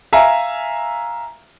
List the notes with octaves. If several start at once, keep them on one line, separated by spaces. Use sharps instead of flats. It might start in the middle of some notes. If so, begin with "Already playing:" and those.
E5 F5 G#5 A#5